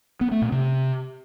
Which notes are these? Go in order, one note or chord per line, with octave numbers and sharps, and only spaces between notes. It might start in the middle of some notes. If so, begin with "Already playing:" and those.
B3
A3
A#2
C3